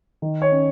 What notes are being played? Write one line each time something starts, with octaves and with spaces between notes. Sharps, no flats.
D#3
C#5
C#4